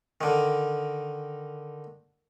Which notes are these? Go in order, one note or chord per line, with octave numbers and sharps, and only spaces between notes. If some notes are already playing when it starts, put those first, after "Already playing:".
D3 D#3